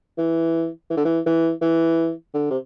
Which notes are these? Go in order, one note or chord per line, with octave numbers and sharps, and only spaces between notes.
E3
E3
D3
E3
E3
E3
D3
C3